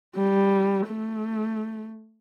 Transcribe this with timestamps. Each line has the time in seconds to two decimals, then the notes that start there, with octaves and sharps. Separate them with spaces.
0.16 G3
0.88 A3